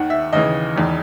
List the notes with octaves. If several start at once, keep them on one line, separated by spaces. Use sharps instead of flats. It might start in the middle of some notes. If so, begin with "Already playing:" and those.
Already playing: D#2 D#3 F#5
E5
D#2 C#3 E3 D#5
E1 E2 D#3